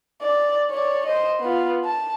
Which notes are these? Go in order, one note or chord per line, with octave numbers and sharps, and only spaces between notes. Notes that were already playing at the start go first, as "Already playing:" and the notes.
D5
C#5 D5
C5 D#5
B3 F4
A5